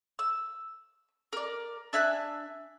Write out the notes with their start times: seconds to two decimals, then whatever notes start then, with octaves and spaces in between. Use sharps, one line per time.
0.19 E6
1.33 A#4 D5
1.93 D4 E5 G#5 F#6